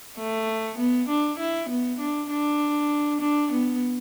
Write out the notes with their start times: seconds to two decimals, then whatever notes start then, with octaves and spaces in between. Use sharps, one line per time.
0.17 A3
0.78 B3
1.08 D4
1.38 E4
1.69 B3
1.99 D4
2.30 D4
3.20 D4
3.51 B3